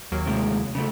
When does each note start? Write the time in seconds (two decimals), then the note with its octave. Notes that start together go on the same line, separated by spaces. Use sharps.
0.12 D#2 F#3 A#3
0.27 A2 C3 G#3
0.75 C#3 A3